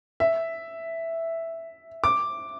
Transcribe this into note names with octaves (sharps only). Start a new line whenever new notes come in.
E5
D6